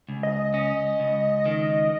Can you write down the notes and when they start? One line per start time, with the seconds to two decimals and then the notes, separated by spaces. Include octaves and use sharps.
0.09 C#2
0.23 D#5
0.54 C#4 D#5
1.00 C#2
1.46 D#3